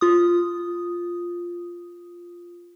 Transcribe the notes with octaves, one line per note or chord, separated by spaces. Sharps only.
F4 D#6